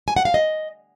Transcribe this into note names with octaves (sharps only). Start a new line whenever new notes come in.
G#5
F#5
F5
D#5